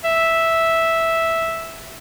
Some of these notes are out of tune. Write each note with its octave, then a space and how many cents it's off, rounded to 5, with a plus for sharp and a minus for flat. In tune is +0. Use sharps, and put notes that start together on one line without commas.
E5 -5